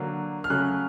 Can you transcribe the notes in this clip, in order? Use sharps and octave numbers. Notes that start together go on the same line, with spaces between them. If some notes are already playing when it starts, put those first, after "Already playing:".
Already playing: D3 F#3 A#3
F6
C#3 F#3 A3 C#4 F#6